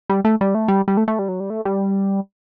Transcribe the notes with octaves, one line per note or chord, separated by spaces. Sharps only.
G3
A3
G3
A3
G3
G3
A3
A3
G3
F#3
G3
A3
G3